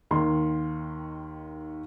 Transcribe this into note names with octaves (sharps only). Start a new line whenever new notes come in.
D#2 D#3 C6